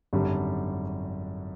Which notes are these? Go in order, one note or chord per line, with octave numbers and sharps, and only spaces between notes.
G#1 F#2 D3 G3